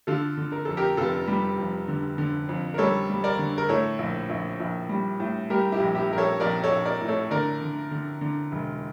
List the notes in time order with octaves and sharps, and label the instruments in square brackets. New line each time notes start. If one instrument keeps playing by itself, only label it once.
[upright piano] D3 F4 A4
D3
A#4
F2 A4
G4 A#4
F1 F4 A4
G3
F2
D3
D3
F2
A#4
G3 A4 C#5
G3
A#4 D5
D3
A#4
A2 A4 C#5
A#1
A#1
A#1
G3
A2
G3 G4 A#4
E4 G4
A#1
E4 G4
A#1 A#4
A4 C#5
A#1 A#4 D5
A4 C#5
A#1
A#4 D5
A2
A4 C#5
D3 A#4 D5
D3
D3
D3
E1